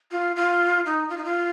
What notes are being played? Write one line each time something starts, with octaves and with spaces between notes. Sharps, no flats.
F4
F4
D#4
F4
D#4
F4